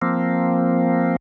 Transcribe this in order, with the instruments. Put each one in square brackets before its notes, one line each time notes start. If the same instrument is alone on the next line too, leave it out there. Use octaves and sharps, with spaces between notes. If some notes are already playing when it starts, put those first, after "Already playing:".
[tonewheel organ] F3 A#3 C4